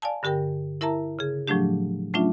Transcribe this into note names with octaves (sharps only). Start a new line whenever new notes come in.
D5 F5 G#5 A5
G2 D3 G4 A#4 G5
E4 A#4 E5 A5 A#5
C#3 G#4
A2 F3 F#3 A3 D4 G4
F#3 A3 C#4 D4 F4 E5